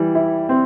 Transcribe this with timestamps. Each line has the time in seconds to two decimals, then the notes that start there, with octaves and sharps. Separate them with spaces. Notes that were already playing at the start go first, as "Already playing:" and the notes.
Already playing: E3 G3
0.15 E4
0.49 C4